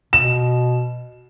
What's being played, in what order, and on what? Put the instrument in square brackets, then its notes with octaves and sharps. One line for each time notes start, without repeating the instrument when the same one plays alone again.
[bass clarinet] B2 [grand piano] E7